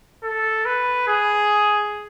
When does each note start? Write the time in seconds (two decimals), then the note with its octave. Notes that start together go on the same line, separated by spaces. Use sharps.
0.24 A4
0.65 B4
1.07 G#4